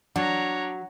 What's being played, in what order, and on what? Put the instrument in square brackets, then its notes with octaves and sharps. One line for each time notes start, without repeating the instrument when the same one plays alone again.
[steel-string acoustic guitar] F#3 [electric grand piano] D4 [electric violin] C#5 A#5 [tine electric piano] F#5